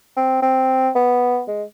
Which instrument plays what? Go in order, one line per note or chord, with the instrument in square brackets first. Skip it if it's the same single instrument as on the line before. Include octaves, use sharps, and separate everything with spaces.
[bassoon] C4
C4
B3
G#3